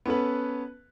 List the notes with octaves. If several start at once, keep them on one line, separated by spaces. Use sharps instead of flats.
B3 C#4 A4 B4